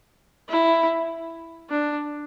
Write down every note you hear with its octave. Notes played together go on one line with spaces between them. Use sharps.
E4
D4